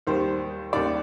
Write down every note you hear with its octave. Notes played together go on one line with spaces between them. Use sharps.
D#2 D#3 G3 C5
D#2 D#3 G3 D5